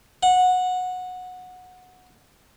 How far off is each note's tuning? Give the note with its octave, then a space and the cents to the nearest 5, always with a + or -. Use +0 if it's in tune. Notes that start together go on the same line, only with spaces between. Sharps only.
F#5 -15